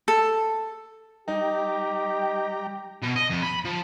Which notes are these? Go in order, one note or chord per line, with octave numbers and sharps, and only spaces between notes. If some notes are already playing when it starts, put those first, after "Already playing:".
A4
G3 D#4 G4 G5 A#5
B2
D#5
F2
B5
F3